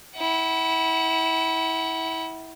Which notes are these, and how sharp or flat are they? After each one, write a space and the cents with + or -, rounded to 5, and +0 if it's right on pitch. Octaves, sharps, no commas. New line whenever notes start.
E4 -20 F#5 +30